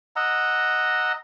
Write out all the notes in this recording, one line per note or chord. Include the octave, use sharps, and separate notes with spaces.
D#5 F#5 A#5 E6